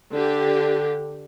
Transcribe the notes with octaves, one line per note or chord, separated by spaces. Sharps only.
D3 G4